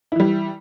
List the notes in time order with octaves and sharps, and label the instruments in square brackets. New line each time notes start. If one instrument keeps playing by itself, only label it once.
[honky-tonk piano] E4
E3
G3